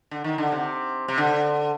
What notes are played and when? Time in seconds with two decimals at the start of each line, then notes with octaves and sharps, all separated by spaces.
0.11 D3
0.24 D#3
0.38 D3
0.52 C3
1.08 C3
1.18 D3